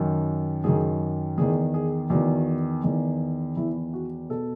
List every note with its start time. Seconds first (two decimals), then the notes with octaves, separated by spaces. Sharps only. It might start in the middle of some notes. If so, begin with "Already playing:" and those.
Already playing: F#2 D#3
0.64 F#2 D#3 G#4
1.38 E2 D#3 G#4
1.74 G#4
2.10 E2 D#3 F#4
2.84 E2 D#3
3.57 E2 D#3 E4
3.94 F#4
4.30 B2 A4